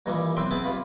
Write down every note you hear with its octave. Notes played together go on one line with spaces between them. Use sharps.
G2 A#2 D#3 E3 G3
B1 C4 B4 E5 G5 C6
B3 C4 G#4 C5 A5 B5
G2 C3 F4 B5